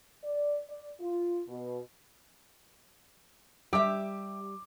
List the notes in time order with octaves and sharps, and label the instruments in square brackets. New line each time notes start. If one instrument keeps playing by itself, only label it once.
[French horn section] D5
D5
F4
B2
[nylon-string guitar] G3 [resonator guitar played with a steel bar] G4 E5 [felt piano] D6